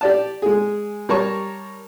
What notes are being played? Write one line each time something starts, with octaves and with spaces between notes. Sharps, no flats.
G4 D5 A5
G#3 G#4
G3 A#4 C#5 A5 C#6